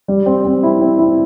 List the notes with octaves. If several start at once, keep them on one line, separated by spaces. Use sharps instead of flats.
G3
C4
C4
E4
C4
E4